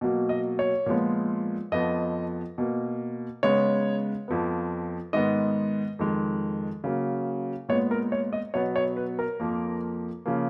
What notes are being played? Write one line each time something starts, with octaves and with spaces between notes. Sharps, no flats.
B2 F#3 A#3
D#5
C#5
A#2 F3 G#3 B3
F2 F3 B3 D#5
B2 A#3
C#3 G#3 B3 C#5
F2 F3 B3
G#2 D#3 G#3 B3 D#5
F2 D#3 G#3
C#3 F#3 A#3
A#2 G#3 B3 C#5
A#4
C#5
D#5
B2 F#3 B3 C#5
C#5
B4
A#4
F2 F3 A#3
C#3 F3 A#3